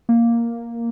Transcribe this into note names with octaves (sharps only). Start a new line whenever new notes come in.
A#3